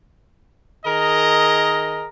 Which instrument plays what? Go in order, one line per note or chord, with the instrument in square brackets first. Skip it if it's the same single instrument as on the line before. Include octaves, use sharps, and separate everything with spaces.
[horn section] D#3 G#4 A#4 D#5 A#5